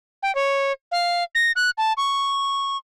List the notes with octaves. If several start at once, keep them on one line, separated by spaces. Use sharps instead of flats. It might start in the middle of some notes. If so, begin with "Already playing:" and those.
G5
C#5
F5
A#6
F#6
A5
C#6